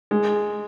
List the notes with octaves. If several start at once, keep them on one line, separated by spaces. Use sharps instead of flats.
G#3